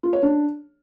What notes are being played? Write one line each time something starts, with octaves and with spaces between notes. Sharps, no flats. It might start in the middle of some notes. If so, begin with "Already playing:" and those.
F4
C#5
D4